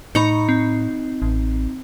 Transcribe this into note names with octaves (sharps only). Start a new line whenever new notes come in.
A2 D#4 A#5 B5 C#6 C#7
C4
A1